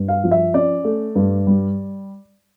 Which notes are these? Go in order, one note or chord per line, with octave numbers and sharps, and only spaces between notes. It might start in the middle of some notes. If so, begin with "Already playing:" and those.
Already playing: G2
F5
F3
E5
C#4 D5
A3
G2
G3